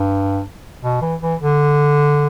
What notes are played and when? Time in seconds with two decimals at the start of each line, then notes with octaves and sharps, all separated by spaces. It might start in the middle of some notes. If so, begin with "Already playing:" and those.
Already playing: G2
0.83 B2
1.02 E3
1.22 E3
1.41 D3